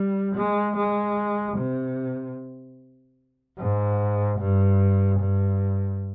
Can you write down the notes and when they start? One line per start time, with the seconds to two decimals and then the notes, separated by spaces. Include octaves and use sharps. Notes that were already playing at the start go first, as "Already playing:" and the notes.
Already playing: G3
0.35 G#3
0.76 G#3
1.57 C3
3.58 G#2
4.39 G2
5.20 G2